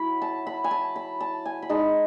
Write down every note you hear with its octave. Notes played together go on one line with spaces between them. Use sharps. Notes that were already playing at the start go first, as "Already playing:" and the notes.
Already playing: F#3 E4 B5
A5
B5
G#5
A5
B5
A5
G#5
B5
G#3 D#4 A5